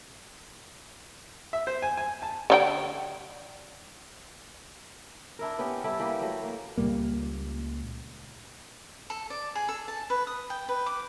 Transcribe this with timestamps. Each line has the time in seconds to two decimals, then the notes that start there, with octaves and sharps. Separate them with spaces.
1.53 E5
1.67 C5
1.82 G#5
1.97 G#5
2.22 A5
2.50 D3 D#4 G5
5.39 D4 E4 A#4
5.59 B3 C#4 G4
5.84 G3 E4 G4 A4
5.99 E3 A#3 G4 B4
6.21 F#3 A3
6.43 A#3
6.78 C#2 A#2 G3 A#3
9.10 A4
9.30 D5
9.55 G#4
9.69 A4
9.88 A5
10.10 B4
10.27 D#6
10.50 G5
10.69 B4
10.86 D6